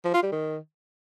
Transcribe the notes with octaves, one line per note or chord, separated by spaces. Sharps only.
F3
F4
G3
D#3